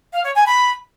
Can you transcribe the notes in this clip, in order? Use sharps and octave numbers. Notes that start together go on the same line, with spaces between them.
F5
C#5
G#5
B5